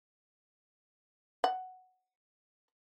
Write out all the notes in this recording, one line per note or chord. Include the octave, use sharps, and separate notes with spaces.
F#5